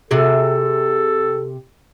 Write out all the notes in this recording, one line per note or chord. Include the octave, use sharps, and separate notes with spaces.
C3 F#4 G#4 A4